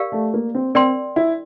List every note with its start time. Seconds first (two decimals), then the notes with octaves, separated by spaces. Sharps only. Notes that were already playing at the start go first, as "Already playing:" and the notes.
Already playing: G4 A#4 D5 F5
0.12 A3
0.34 A#3
0.55 C4
0.75 C4 A#4 D5 G5 C6
1.16 E4